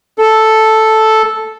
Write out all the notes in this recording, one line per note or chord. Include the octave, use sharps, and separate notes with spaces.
A4